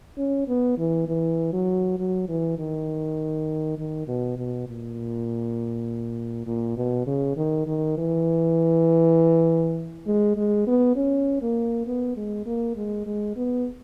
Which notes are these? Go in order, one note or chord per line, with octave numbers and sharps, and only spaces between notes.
C#4
B3
E3
E3
F#3
F#3
E3
D#3
D#3
B2
B2
A#2
A#2
B2
C#3
D#3
D#3
E3
G#3
G#3
B3
C#4
A#3
B3
G#3
A#3
G#3
G#3
B3